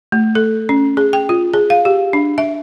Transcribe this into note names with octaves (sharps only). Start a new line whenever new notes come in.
A3
A4
C#4
G#4
G5
F4
G#4
F5
G4
D4
E5